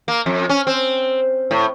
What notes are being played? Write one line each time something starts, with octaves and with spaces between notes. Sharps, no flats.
A#3
F2
C#4
C4
A2